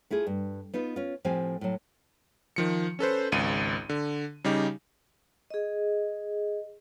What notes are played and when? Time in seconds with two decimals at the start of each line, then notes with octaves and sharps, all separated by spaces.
0.10 A3 E4 F4 G#4
0.27 G2
0.74 B3 D#4 F4 B4
0.96 C#4 F4
1.25 A2 F3 C4 G4 F5 G#5
1.61 A2 F#3
2.56 D#3 F3 C#7
2.99 C#4 A4 B4 C5
3.32 G#1 C#2 D#7
3.89 D3
4.44 C#3 G3 D#4 G4
5.50 G#4 D#5